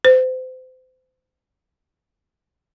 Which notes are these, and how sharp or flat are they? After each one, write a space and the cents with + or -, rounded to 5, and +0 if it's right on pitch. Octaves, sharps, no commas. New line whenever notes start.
C5 -30